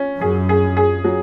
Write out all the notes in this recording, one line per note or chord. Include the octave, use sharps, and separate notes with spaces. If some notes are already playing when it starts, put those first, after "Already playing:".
Already playing: C#4
F#2 G#4
G#4
G#4
F#3